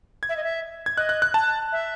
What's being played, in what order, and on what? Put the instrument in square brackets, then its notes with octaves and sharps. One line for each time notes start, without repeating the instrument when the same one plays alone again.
[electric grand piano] G#6
[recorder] E5
D#5
E5
[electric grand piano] G#6
[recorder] D#5 [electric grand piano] F#6
[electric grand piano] F#6
F#6
A5
[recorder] E5